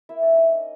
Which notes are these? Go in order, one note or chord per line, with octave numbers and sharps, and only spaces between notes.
A#3 E4 E5
D4 D5
C#4
D#4 D#5
C#4